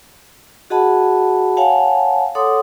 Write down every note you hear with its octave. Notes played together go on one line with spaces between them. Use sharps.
F#4 G#4 D#5 F#5 A5 B5
C#5 F5 F#5 G#5 A5
A4 C#5 F#5 C6 D6 D#6